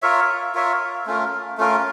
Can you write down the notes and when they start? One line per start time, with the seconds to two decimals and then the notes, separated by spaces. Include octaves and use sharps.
0.02 F4 A#4 C#5 E5
0.55 F4 A#4 C#5 E5
1.06 A3 C#4 F4 A#4
1.58 A3 C#4 F4 A#4